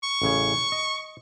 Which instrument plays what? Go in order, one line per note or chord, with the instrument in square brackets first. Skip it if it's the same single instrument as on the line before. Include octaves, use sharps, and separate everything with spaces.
[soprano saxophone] C#6
[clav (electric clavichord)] A1 C#3 C#5
D#5